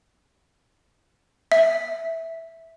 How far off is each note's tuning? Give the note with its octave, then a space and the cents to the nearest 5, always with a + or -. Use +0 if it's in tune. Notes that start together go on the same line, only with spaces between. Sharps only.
E5 -5